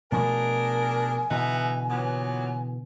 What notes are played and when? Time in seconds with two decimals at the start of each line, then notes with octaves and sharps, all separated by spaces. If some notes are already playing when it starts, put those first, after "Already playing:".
0.12 B2 F3 A3 D4 G#4 A#4 G#5
1.31 B2 D3 E3 B3 D#4 E5
1.90 A#2 F#3 B3